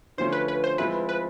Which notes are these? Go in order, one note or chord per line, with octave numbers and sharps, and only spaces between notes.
D3 F3 A3 C#4 C5
B4
B4
C5
F3 G#3 C4 E4 B4
B4